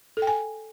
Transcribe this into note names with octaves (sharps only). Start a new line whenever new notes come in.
A4
G5
G#5